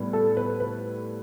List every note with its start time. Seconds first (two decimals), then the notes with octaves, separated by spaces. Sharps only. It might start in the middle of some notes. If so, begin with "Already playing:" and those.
Already playing: A2 G3 B3
0.13 A4
0.37 B4
0.60 B4